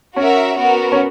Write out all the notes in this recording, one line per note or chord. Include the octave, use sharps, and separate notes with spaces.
C#4 F#4 A#4 E5
B3 F#4 A#4
C#4